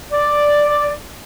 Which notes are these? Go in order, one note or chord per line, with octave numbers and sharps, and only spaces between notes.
D5